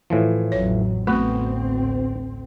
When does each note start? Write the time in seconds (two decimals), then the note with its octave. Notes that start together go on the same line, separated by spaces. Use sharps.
0.10 A2 E3 F3
0.52 A1 F2 F#3 C#5
1.07 A1 D2 A3 B3 C4 F#4 B4